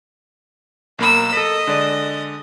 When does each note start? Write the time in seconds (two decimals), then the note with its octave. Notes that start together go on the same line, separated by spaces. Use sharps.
0.99 B1 A#3 A#4 B5 E6
1.33 A4 D#5 B6
1.67 D3 G#3 D5